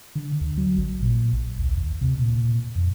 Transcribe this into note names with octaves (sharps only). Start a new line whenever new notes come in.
D3
D2
F#3
A1
A#2
A#1
D2
D#2
C3
A#2
F2